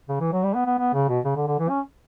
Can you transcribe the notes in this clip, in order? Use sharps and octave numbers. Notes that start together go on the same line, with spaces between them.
C#3
E3
F#3
G3
B3
B3
B3
C#3
B2
C#3
D3
D3
E3
C#4